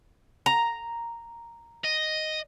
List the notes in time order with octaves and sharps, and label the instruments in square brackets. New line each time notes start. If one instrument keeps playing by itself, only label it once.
[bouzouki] A#5
[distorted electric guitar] D#5